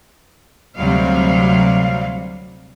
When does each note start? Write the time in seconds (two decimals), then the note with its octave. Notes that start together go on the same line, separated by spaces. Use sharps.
0.78 D2 C3 F#3 G3 F5